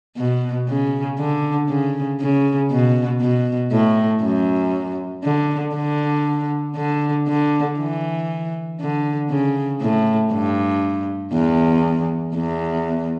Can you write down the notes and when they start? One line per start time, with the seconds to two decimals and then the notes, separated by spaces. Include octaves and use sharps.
0.17 B2
0.68 C#3
1.19 D3
1.69 C#3
2.20 C#3
2.71 B2
3.21 B2
3.72 A2
4.23 F#2
5.24 D3
5.75 D3
6.76 D3
7.28 D3
7.79 E3
8.80 D3
9.30 C#3
9.81 A2
10.32 G2
11.33 E2
12.35 E2